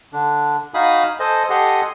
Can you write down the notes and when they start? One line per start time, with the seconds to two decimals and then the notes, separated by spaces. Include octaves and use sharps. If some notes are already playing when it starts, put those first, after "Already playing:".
0.13 D3 D4
0.74 D#4 F#4 F5 G#5 B5 D#6
1.20 A4 C5 D#5 G#5
1.50 G4 A4 D#5 F#5 G#5 C6